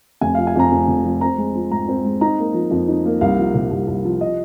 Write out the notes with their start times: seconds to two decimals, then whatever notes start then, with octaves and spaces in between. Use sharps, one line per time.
0.21 F1 G#5
0.35 F3 F5
0.47 G#5
0.56 F2 A#5
0.72 F1
0.88 F1
1.05 F3
1.21 C4 A#5
1.38 G#3
1.55 F3
1.71 G#2 A#5
1.88 C4
2.05 G#3
2.21 D#4 A#5
2.39 A#3
2.54 F3
2.71 F2
2.88 D#4
3.05 A#3
3.21 C2 F5
3.39 F3
3.54 C3
3.71 C2
3.88 C2
4.05 F3
4.21 D#5